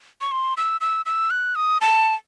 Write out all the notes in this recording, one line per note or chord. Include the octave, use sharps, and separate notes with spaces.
C#6
C6
E6
E6
E6
F#6
D#6
A5